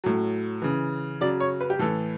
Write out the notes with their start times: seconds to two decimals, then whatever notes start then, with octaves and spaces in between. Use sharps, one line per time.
0.04 A2 F#3
0.62 C#3 E3
1.21 C#3 F#3 D5
1.40 C#5
1.61 B4
1.70 G4
1.79 A2 E3 A4